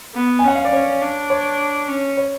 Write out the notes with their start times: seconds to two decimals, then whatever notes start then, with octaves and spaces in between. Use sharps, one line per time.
0.15 B3
0.39 G#5
0.44 C#4 F#5
0.55 F5
0.65 D5
0.73 C#4 C#5
1.02 D4
1.30 C#5
1.88 C#4
2.17 C#5